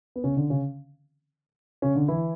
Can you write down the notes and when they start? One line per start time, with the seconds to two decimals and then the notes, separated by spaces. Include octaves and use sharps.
0.16 B3
0.23 C#3 C#4
0.37 D3 D4
0.50 C#3 C#4
1.82 C#3 C#4
1.95 D3 D4
2.08 E3 E4